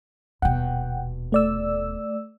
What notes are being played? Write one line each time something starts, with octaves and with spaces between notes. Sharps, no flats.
D#1 B2 F#5 G5
A3 D5 E6